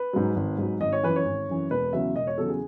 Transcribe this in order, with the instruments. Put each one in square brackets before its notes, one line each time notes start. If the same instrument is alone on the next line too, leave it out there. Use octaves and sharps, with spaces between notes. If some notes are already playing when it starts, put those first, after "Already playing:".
Already playing: [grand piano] B4
G#2 F#3
G#1
G#2 F#3
G#1 D#5
C#5
F#2 E3 B4
C#5
G#1
F#2 E3
E1 B4
E2 C#3 F#3 E5
E1 D#5
C#5
E2 C#3 F#3 A4
G#4